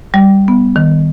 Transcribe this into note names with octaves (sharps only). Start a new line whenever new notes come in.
G3
B3
D#3